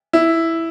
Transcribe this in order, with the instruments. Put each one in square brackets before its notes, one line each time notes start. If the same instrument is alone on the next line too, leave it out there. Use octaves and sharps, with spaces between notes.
[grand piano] E4